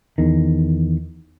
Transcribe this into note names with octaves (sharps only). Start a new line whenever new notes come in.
E2 D#3